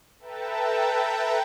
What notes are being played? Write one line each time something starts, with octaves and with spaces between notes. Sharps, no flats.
A4 B4 E5 G5 A5 A#5